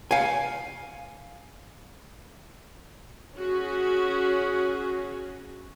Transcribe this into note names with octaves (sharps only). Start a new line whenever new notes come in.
F5 G#5
C#4 F#4 G#4